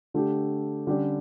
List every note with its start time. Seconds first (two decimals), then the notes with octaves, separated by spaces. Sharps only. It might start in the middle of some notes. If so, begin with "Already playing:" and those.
0.14 D3 A3 D4 G4
0.87 D3 G3 C#4 G4 D5